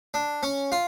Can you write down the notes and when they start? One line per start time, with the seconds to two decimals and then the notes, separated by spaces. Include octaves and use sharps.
0.14 D4
0.43 C#4
0.72 F4